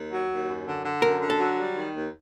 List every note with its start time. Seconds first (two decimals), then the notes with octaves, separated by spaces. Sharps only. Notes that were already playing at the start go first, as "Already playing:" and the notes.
Already playing: D#2
0.12 F#3
0.30 D#2
0.49 F#2
0.66 D3
0.85 D3
1.02 F#2 A#4
1.21 D3
1.30 A4
1.39 F#3
1.57 G3
1.75 D#3
1.94 D#2